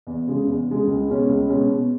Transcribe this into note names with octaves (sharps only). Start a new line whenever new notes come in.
E2
C#3 G#3
E2
C#3 G#3
C#2
B2 G#3 C#4
C#2
B2 G#3 C#4
B2